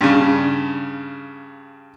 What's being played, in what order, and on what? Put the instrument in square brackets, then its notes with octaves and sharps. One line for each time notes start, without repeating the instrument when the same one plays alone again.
[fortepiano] G2 C#3